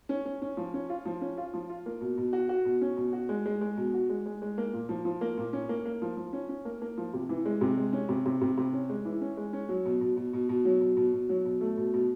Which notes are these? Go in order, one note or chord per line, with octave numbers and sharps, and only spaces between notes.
C#4
C#4
C#4
F3
C#4
F4
F3
C#4
F4
F3
F4
A#3
B2
B2
F#4
F#4
B2
C#4
B2
F#4
G#3
G#3
G#3
B2
F#4
G#3
G#3
G#3
A#3
A#2
F3
F3
A#3
A#2
C#4
A#3
A#3
F3
F3
C#4
C#4
A#3
A#3
F3
C3
E3
G#3
C3
G#3
C#4
C3
C3
C3
C3
C#4
G#3
E3
C#4
G#3
C#4
F#3
B2
B2
B2
B2
B2
F#3
B2
B2
B2
F#3
B2
A3
B2
B2